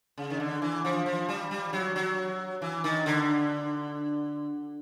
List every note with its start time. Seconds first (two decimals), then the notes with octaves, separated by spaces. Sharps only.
0.17 C#3
0.30 D#3
0.40 D3
0.62 E3
0.84 F3
1.06 F3
1.28 G3
1.51 G3
1.73 F#3
1.96 F#3
2.62 E3
2.84 D#3
3.06 D3